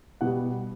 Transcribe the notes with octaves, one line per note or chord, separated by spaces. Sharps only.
B2 G3 B3 F#5